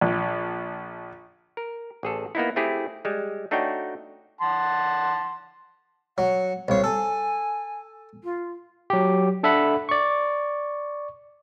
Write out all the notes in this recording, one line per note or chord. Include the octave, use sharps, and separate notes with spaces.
A#1
A#4
A1 G#4 A4
A#3 B3 D#4 E4
A3 C4 E4 G4 G#4
G3 G#3
A3 D4 D#4 F#4 C#5 G5
F#5 A5 C6
F#3 F#5
C2 C#5 F5
A4 G#5
F4
F#3 G4
D4 A4 E5 F#5 B5
D5 C#6